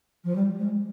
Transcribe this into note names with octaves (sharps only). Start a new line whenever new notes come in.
F3
G3
G#3